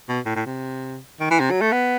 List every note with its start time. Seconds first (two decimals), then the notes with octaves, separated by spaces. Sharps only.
0.08 B2
0.25 A2
0.36 A2
0.46 C3
1.20 D#3
1.30 E3
1.40 C3
1.51 F#3
1.61 A3
1.72 B3